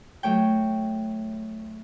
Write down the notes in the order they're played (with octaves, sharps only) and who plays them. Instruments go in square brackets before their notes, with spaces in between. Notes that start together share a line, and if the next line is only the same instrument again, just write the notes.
[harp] F#3 A3 C#5 G5